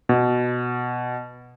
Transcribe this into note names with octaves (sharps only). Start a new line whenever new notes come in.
B2